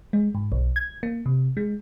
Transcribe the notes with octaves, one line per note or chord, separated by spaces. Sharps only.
G#3
G#2
B1
G#6
A#3
C3
G#3